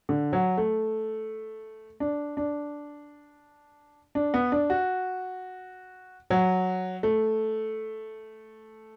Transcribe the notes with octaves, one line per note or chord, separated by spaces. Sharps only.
D3
F#3
A3
D4
D4
D4
B3
D4
F#4
F#3
A3